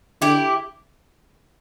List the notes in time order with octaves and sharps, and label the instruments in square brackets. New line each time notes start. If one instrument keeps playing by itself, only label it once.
[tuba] D3 [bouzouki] E4 G4